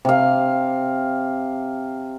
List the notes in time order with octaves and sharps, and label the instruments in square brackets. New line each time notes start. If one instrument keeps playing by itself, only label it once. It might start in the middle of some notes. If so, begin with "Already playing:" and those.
[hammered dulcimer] C3 F5